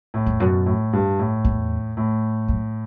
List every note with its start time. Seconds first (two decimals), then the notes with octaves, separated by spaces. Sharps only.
0.14 A2
0.26 E2
0.40 F#2 B2
0.66 A2
0.93 G2
1.19 A2
1.45 E2
1.97 A2
2.48 F#2